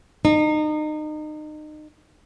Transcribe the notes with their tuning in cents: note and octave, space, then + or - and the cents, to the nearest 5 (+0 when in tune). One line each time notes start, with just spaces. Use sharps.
D#4 -30